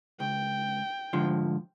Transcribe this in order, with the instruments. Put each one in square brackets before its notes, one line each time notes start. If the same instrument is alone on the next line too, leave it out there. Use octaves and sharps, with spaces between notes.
[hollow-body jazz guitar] C#2 [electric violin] G5
[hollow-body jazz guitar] G#2 D3 F3